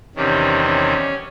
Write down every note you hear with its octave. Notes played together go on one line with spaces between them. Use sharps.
E2 C3 D#3 G3 C#4
C#4